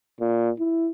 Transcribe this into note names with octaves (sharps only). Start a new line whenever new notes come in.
A#2
E4